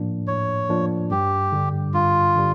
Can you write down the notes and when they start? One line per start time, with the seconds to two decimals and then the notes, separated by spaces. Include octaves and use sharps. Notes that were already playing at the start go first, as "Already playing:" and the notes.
Already playing: A2 F3 A#3 D4
0.27 A2 C#5
0.69 F3 A#3 D4
1.11 G2 G4
1.52 D3 G3
1.94 G2 F4
2.36 D3 G3